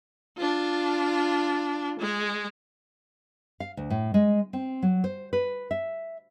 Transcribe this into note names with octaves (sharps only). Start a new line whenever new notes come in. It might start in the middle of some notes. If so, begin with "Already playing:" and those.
D4 F4
G#3
F5
D2
A2
G#3
C4
F#3
C5
B4
E5